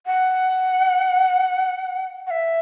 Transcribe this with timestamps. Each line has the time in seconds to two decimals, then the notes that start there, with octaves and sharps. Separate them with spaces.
0.06 F#5
2.27 F#5
2.31 E5